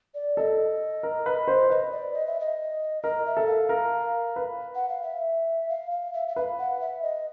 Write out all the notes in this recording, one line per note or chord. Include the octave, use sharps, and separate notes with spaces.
D5
A4 D#5
A#4
B4
C5
B4 D#5
D5
D#5
E5
D#5
A#4 D#5
E5
A4
F5
A#4
B4
F#5
F5
E5
F5
F5
E5
E5
B4 F5
F#5
E5
D#5